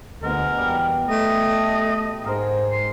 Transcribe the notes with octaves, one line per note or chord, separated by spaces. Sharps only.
D2 B2 G#3 A#4
E2 G3
A3 D#5
G#2 G#4 A#4 C5
C6